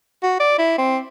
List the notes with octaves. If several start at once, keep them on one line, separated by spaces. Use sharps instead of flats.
F#4
D5
E4
C4